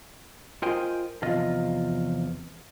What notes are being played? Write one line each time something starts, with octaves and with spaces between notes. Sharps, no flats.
F4 A#4 C5 D#5 G5 G#5
E2 C3 F3 F4 D#5